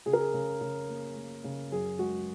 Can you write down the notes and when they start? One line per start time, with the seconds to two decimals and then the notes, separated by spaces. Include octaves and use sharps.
0.06 C#3 G#4
0.13 A#4
0.20 G#4
0.34 C#3
0.61 C#3
0.89 A#3
1.16 A#3
1.44 C#3
1.71 F#2 G#4
1.99 G#3 F#4